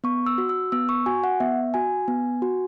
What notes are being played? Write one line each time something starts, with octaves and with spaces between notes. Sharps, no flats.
B3 C#6
E6
F#4
E6
B3 E6
C#6
F#4 G#5
F#5
B3 E5
F#4 G#5
B3
F#4